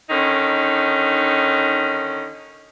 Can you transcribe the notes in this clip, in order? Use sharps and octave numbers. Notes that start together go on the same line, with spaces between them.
D3 D#3 C#4 D#4